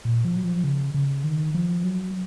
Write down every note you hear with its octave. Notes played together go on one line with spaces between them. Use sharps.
A#2
F3
F#3
F3
C#3
C#3
D#3
F3
F#3